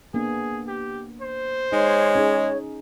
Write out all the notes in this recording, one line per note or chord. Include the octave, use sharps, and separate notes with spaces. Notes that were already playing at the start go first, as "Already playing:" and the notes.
A#3 B3 D4 G#4
G4
C5
G#3 D#4 C#5
C#4 D#4 G#4